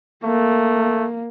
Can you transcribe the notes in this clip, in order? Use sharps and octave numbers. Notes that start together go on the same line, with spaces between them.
A3 A#3